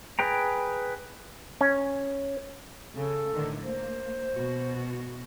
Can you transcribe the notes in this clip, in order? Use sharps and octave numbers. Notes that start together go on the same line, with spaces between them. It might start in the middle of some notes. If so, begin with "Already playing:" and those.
G#4 B4 G5 A#5
C#4
C#3 A4
A2 D3 D#3
A#3 C5
B2 F#4